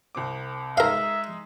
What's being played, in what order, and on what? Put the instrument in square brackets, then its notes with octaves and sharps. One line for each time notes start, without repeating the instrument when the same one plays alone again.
[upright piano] C2 C4 D6
[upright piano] G#3 D#4 [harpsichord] A#4 F5 [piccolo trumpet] E5